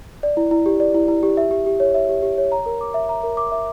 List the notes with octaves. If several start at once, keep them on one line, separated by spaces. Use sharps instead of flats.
D5
E4
E4
G4
D5
E4
E4
G4
E5
G4
G4
C#5
E5
G4
G4
C#5
A#5
A#4
D6
E5
A#5
A#4
D6
E5